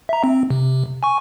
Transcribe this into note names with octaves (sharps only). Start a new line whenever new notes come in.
E5 A#5
C4
C3
G#5 C#6